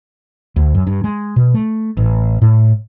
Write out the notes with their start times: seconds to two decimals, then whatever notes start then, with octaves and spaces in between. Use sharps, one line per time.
0.56 D2
0.75 F#2
0.87 G2
1.04 G#3
1.36 B2
1.54 A3
1.97 A1
2.42 A2